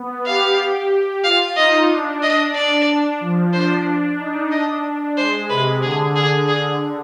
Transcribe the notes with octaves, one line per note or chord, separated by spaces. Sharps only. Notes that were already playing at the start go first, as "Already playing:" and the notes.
Already playing: B3
G4 F5
F4 F5
D#4 D#5
D4
D#5
D4 D5
F3
D4 C5
D4
D#4
D4 D#5
G#3 C5
C3 B4
D3 G#4
G#4
G#4